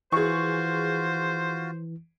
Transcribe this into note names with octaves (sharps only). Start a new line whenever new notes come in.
E3 F4 F#4 G#4 C5 C#6